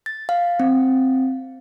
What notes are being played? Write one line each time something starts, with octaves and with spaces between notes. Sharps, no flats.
A6
F5
C4